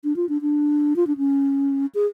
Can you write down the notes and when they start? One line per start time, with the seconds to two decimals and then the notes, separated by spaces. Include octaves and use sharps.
0.04 D4
0.16 F4
0.29 D4
0.42 D4
0.96 F4
1.07 D4
1.17 C#4
1.95 G#4